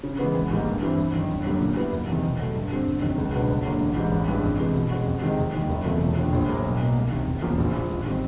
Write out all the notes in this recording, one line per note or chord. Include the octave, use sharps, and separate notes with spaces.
C#3
E3 G#3 B3
G#1
G#2 D#3 G3 A#3
G2
E3 G3 C4 E4
G1
F#2 D#3
G1
F#2 D3 G3 A#3
A#2
G3 B3 E4
F#1
E2 C3 D#3
B2
F#3 A3
G2
D3 G3 C4
G1
F2 C3 D#3 F#3
C#2
B2 F#3 B3 D4
G1
G2 D3 F#3 A#3
A1
G#2 E3 G3
A1
G2 E3 G#3
F2
C3 E3 G#3
B2
G#3 C#4 F#4
F2
C3 D#3 G#3
F1
D#2 D#3 G3
F#1
E2 C3 F3 A3
E1
D#2 D3 F3
A#1
A2 F#3 A#3
B1
B2 F#3 A#3
C2
C3 D#3
F1
E2 C#3 F3 A#3
A#1
A#2 F3
A1
D#3 G3 C4